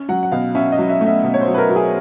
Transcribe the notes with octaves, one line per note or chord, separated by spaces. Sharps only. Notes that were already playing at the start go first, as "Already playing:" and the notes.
Already playing: C#4
F#3 F#5
F#5
B2 F5
C#4 E5
D#5
F#3
E5
A3
E5
B2
C#5
C5
F#3
B4
A#4
F#3
G#4